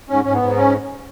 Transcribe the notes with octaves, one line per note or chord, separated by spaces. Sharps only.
G#2 C#4
G#2 C#4
B3
G#2
C#4